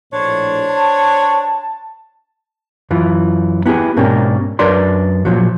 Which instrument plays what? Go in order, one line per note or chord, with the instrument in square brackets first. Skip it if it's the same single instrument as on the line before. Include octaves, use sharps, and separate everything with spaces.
[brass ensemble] A#1 A2 [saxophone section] D4 C5 C#5
[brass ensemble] A5
[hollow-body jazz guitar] F#2 E3 F4
B3 E4 G4 G#4
G#2 B2 A#3 C#4 D4 G4
F#2 D4 A#4 B4 D5 C6
A#2 F3 F#3